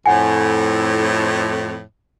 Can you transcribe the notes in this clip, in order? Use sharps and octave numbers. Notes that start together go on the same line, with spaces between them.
F2 A2 F#5 G#5